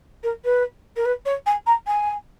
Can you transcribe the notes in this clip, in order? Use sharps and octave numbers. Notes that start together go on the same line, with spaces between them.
A#4
B4
A#4
B4
C#5
G#5
A#5
G#5